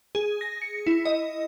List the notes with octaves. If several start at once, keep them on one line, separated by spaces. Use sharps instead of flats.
G#4
A#6
C#7
E4
D#5